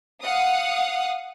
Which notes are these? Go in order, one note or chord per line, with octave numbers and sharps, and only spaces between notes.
F5 F#5 D#6